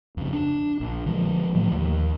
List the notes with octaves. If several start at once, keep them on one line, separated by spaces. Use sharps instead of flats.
F2 C#3
D4
A#1
D3 F3 G#3
A2 F3 A3 A#3
D#2